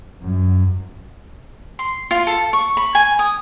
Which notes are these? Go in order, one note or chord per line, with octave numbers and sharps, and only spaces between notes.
F#2
C6
F4
A4
C#6
B5
G#5
D#6